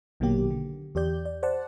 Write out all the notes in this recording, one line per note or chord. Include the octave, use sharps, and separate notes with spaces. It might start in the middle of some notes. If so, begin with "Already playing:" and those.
A#1 B2 D#3 F#3 A#3 G4
D3
E2 G4 D5 G6
D5
C5 D5 F#5 A5